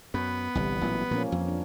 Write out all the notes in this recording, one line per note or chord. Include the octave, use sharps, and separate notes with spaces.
F#2 B3 B4
G1 C2 E3 G3
A1 A#2 F#3
A#2 F3 A#3 C#4
F2
D4